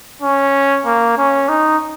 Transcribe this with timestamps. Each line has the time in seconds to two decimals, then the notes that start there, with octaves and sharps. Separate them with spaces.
0.22 C#4
0.86 A#3
1.18 C#4
1.49 D#4